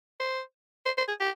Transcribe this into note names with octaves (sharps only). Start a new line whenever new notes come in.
C5
C5
C5
G#4
G4